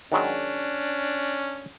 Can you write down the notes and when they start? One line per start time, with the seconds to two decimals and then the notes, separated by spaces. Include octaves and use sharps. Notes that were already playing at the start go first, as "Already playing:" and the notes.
0.12 D#3 F#3 G#3 C#4 D4